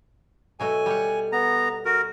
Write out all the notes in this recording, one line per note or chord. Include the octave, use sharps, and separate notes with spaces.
B2 F#3 A3 G#5
G3 F#5
B3 A#5
F#4 A#4